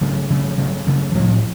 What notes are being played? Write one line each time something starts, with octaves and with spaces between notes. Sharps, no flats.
C#3 F#3 A3
C#3 F#3 A3
C#3 F#3 A3
C#3 F#3 A3
A2 F3 A3 C4